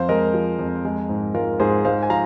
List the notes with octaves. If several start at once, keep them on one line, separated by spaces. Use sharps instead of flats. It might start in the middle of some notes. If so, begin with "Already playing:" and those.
Already playing: F2 C5 F5
G#3 A#4 D#5
F3
F2
G#3
G#2
G#3 F4 A#4
G#2 G#4 C5
G#3 C5 F5
G#5
F3 F5 A#5